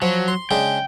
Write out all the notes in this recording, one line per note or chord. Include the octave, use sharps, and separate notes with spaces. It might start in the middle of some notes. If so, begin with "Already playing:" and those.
F3 F#3
C6
C#3 G#3 D4 G5